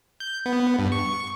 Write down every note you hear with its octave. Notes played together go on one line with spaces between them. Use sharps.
G6
B3
G2
C#6